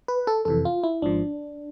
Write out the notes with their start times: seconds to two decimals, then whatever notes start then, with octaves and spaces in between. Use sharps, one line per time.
0.08 B4
0.27 A4
0.45 F2 C3 E3 A4
0.65 F4
0.84 E4
1.02 G#1 G#2 F3 D4